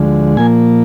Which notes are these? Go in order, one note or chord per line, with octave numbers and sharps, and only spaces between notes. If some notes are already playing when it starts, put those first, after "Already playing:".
Already playing: D2 D3 F3 G#3
A#2 F3 A#3 G#5